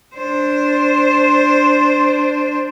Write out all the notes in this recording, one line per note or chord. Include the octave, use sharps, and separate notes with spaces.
D4 C5